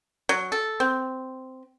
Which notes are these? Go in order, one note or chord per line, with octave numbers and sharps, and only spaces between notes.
F#3
A4
C4